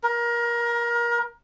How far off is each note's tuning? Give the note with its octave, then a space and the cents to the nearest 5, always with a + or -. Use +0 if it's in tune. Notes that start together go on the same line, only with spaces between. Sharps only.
A#4 +25